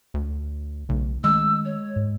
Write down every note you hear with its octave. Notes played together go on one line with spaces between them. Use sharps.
D2
B1 C#3 A3
D#3 G#3 A3 C#4 E6
C#5
G#2